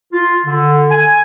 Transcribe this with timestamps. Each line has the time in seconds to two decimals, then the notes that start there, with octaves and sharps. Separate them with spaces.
0.12 F4
0.46 D3
0.90 G#5